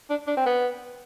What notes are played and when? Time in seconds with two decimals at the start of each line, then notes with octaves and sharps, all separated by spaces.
0.10 D4
0.27 D4
0.37 C4
0.46 B3